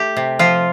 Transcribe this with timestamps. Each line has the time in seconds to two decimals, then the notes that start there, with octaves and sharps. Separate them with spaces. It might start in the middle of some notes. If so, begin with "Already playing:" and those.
Already playing: A3 G4
0.17 C3
0.39 F3 F4